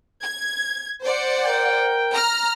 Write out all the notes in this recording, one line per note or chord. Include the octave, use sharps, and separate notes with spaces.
G#6
C5 D5 F#5
A#4 G5
A#5 F6